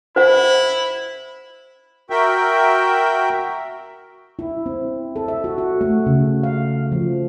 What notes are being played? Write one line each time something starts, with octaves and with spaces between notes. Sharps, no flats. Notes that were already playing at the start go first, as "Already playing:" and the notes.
E4 C5 F#5
F#4 A#4 E5 G5
E4
C4
A4
E5
F#4
F#4
A3
C#3
F5
F3